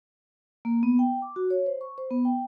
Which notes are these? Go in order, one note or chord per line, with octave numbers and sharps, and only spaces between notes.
A#3
B3
G5
D6
F#4
C#5
C5
C#6
C5
B3
G5